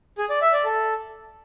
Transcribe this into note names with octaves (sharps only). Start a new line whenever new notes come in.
G#4
D5
E5
D5
A4